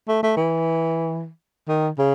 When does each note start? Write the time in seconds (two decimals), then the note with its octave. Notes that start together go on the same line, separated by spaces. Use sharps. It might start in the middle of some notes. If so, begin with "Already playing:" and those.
0.08 A3
0.23 A3
0.37 E3
1.68 D#3
1.98 C#3